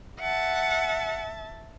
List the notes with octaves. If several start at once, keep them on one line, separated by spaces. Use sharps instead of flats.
E5 F#5 A5